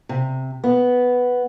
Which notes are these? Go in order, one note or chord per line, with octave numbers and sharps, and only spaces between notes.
C3
B3